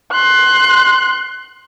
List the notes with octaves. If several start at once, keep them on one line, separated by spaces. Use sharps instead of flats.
C6 F#6